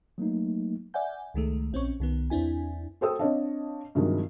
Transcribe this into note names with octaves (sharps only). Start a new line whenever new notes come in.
F#3 A3 A#3 D#4
D5 E5 F#5 G#5 G6
C#2 D#3 G#3 A3
A#1 C4 C#4 C#6
C2 D#3 B3
E2 C4 D4 E4 G#5
F#4 A4 C5 G5 D#6 E6
C4 D4 C#5 D#5 F5 A5
G2 C3 D#3 F3 F#3 G#3